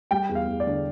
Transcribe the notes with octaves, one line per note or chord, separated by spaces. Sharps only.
G3 G5
E2
F5
E2
D5
D3